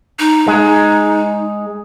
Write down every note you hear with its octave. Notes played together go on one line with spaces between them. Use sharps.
D#4
G#3